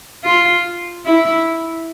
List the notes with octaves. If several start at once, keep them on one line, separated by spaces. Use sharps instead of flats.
F4
E4